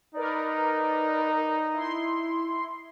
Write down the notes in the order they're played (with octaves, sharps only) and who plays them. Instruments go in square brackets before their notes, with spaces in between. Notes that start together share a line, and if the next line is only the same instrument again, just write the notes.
[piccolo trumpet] D#4 [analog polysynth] A#4 B4 D5
[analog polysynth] E4 C6